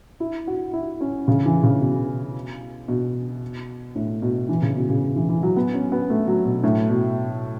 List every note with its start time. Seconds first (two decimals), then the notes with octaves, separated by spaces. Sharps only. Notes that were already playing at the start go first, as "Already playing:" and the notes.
0.20 E4
0.47 F#4
0.73 E4
1.01 C#4
1.28 C#3
1.46 E3
1.63 C#3
1.81 B2
2.88 B2
3.95 A2
4.22 B2
4.49 E3
4.62 C#3
4.76 B2
4.89 C#3
5.16 E3
5.29 E3
5.43 F#3
5.56 B3
5.74 C#4
5.92 B3
6.10 A3
6.27 F#3
6.45 B2
6.64 A2
6.90 B2